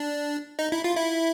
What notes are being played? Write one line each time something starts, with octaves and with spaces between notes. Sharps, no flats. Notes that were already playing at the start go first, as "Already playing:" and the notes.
Already playing: D4
D#4
E4
F4
E4